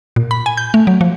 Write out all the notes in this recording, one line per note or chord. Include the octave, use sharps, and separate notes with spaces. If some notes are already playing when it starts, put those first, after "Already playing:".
A#2
B5
G#5
G6
A3
F#3
F3